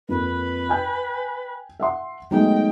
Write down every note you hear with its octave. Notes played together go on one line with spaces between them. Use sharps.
F2 A#3 B4
G5 G#5 G6
E5 F#5 C6
F#3 G#3 A3 B3 D#4 G#4 G5